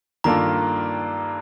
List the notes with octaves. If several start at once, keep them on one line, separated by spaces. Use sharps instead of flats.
G2 D#3 A#3 F4 A4 A#5